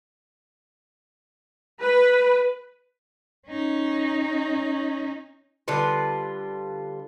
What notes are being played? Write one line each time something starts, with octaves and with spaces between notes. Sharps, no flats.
B4
C#4 D#4
D3 G3 F4 B4